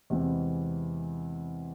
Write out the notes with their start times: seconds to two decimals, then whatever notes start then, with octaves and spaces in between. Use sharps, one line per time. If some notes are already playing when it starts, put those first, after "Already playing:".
0.10 E2 C3 E3 G#3 C4